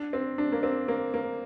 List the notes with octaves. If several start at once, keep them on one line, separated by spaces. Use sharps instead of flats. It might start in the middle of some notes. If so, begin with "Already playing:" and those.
Already playing: D4
C4
D4
A#3
C4
A#3
A#3